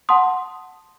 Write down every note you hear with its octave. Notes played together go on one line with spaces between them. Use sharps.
F#5 A5 C6 D#6